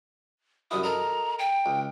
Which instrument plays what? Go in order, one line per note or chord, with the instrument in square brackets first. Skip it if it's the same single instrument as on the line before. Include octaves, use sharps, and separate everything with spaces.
[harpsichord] C2 F#2 E4 [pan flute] D#6
[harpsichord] A4 A#4 D#5 [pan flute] A#5
[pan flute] G5
[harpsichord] C#2